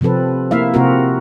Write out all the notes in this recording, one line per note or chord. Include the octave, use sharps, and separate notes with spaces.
C3 F3 C4 A4 B4
A#3 E4 E5 F5
C3 A#3 C4 F4 F#4 A#4